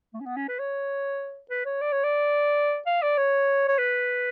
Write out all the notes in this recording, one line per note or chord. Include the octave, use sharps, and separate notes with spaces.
A3
C#4
B3
C#4
B4
C#5
B4
C#5
D5
C#5
D5
F5
D5
C#5
C#5
B4